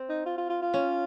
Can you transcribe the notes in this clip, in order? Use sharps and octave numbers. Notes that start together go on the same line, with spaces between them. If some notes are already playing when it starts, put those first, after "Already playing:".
Already playing: C4
D#4
F4
F4
F4
F4
C#4